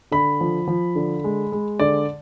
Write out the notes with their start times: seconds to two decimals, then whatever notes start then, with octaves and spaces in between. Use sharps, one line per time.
0.11 D3 B5
0.41 F3
0.68 F3
0.96 D3
1.24 G#3
1.52 G#3
1.80 D3 D5